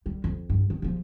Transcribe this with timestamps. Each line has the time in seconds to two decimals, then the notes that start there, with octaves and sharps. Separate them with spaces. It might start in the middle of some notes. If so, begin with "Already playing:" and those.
0.06 D3 G3
0.24 F2
0.50 G2
0.70 D#3
0.82 C#3 F3